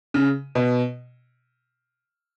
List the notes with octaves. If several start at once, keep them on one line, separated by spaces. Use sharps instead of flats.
C#3
B2